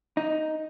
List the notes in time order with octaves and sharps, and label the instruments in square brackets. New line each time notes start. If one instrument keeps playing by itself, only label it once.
[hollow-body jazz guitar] D#4